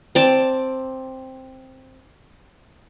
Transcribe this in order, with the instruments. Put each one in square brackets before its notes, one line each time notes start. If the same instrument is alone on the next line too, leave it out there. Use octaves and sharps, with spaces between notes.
[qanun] C4 D5 A5